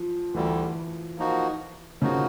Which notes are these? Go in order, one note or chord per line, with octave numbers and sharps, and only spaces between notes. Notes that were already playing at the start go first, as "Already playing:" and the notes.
Already playing: F3
D2 D3 E3 G3
F3 A#3 D#4 F#4
C#3 F3 A#3 D#4 F#4